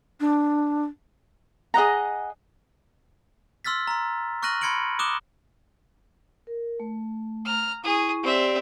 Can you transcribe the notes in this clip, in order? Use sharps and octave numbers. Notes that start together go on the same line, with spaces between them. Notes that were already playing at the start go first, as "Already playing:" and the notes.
D4
G#4 D#5 F#5 A#5
C6 E6 F6 A6 B6
A#5 C6
C#6 F6 F#6 A#6 D#7 F#7
B5 C6 G#6 C#7 D7 F#7
D6 D#6 F#6 E7 G7
A#4
A3
A#5 F6
E4 G#4 C#6 D#6
C4 G4 D5 E5